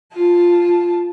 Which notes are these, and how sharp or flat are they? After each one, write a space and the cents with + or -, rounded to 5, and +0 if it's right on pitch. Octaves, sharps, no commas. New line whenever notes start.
F4 +0 A5 +0